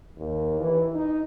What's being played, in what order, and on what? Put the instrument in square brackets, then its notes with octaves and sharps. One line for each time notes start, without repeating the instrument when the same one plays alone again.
[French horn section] D#2
E3
D#4